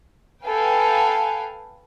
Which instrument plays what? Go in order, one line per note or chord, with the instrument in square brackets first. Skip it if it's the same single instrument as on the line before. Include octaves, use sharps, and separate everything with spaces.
[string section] A4 B4 F5 G5 G#5